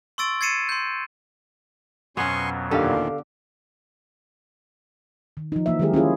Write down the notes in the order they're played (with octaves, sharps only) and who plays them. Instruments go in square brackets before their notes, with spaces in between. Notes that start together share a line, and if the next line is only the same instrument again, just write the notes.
[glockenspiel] C6 C#6 E6 A6 D7
G#6 A6 C7 C#7 D#7 E7
C6 G6
[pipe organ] F2 B2 F#3 [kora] B3 C#4 [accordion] G#5 C6 C#6
[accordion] D#2 A#2 D#3 [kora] D3 G4 [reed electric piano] A4 F5
[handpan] D#3
F3 D#4
E3 A#3 E5
D#3 F#3 G#3 G4 G#4 A#4
C#4 E4 F4 G#4